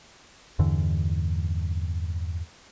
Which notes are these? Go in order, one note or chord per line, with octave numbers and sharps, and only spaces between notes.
E2 G2 D3 E3